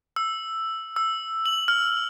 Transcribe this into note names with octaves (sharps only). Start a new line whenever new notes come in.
E6
E6
F#7
F6